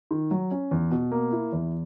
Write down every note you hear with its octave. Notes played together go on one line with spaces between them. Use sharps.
D#3
F#3
C#4
E2
B2
A#3
E4
E2